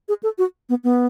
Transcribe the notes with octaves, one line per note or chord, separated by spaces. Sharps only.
G#4
A4
F#4
B3
B3